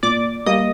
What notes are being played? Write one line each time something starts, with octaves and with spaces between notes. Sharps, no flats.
A#2 D5 D6
G3 A#3 D#5 D#6